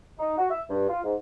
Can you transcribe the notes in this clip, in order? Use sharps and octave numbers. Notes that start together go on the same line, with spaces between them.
D#4
F#4
E5
G2
F4
G#2